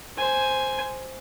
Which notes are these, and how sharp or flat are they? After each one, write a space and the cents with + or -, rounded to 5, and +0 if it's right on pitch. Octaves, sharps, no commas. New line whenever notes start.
C5 +0 G#5 +0